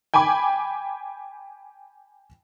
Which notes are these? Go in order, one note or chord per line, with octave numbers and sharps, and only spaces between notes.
G5 G#5 B5 D6